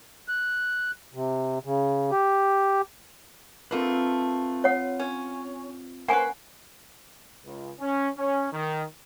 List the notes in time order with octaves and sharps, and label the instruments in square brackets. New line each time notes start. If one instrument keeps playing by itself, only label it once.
[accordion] F#6
C3
C#3
G4
[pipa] D3 A3 A#3 [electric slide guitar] C4 F4 B4
[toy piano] C#5 F#5
[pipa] C#4
[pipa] A#3 C#4 B4 [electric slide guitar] C5 [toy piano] F#5 G#5
[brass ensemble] C#2
C#4
C#4
D#3